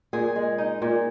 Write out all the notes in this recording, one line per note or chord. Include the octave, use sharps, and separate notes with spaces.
A#2 G#4
G#3
D#4
A#2